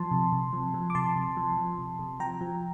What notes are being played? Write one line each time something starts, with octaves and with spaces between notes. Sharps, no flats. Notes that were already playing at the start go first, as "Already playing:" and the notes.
Already playing: F3 A5 C6
C3
C3
F3
F3
D6
C3 A5 C6
C3
F3
F3
C3
C3
F3 G5 A#5
F3